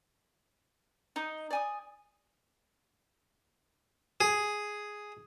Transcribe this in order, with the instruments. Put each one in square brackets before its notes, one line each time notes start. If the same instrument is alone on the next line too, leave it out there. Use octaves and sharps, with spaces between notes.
[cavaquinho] D#4 D#6
D5 G#5 D#6
[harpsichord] G#4